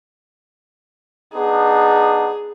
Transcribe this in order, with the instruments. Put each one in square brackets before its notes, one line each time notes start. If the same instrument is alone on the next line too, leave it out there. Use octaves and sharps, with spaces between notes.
[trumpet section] B3 D4 D#4 [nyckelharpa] G#4